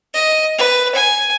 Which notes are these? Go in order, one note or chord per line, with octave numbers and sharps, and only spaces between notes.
D#5
B4
G#5